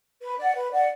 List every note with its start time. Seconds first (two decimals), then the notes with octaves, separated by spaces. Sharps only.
0.22 B4
0.38 D5 F#5
0.55 B4
0.71 D5 F#5